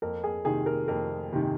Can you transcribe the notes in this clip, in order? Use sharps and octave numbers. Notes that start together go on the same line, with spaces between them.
F2 A#4
G#4
C3 D#3 G#4
A#4
F2 A#4
C3 D#3